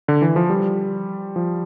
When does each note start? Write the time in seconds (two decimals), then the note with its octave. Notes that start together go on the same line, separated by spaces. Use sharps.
0.08 D3
0.22 E3
0.36 F3
0.50 G3
1.36 F3